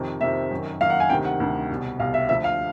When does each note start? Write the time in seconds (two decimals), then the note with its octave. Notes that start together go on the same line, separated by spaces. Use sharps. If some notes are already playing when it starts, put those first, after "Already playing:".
Already playing: F2 C3 D#3
0.21 F2 C3 D#3 E5
0.51 F#2 D#3
0.81 F#2 D#3 F5
0.90 F#5
1.00 G#5
1.10 D2 C3 D#3 G5
1.25 F#5
1.40 D2 C3 D#3
1.70 C2 B2
1.99 C2 B2 F5
2.14 E5
2.28 D2 D3 F3 E5
2.44 F5